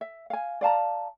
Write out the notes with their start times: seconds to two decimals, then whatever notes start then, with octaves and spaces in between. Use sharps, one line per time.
0.01 E5
0.30 F5 G#5
0.61 D5 F5 A5 A#5